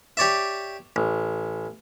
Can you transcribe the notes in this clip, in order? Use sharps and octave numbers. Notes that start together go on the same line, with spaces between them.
G4 C#5 D5 E5
A1